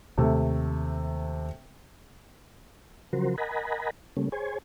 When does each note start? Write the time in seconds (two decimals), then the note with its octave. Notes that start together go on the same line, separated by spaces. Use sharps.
0.18 D#2 C3 A3
3.13 C#3 F3 F#3 F#4 A#4 C5
3.38 A#4 D#5 F#5 G#5 A#5 B5
4.17 C#3 G3 A3 A#3 C#4
4.32 G#4 C5 C#5 G#5